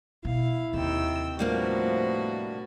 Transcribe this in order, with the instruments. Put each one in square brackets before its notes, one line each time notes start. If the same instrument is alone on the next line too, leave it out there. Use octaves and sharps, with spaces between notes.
[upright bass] B2 [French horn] E4 [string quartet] F5
[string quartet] D#2 G5 E6 [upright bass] C3
[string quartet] A2 B3 F#4 [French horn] F3 [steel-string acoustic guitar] G3 A#3 D4